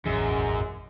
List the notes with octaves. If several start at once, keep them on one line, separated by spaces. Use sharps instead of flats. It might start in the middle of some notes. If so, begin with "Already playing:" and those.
E1 A1 F#2 E3 G#3